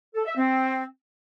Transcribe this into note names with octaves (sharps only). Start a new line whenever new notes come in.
A4
E5
C4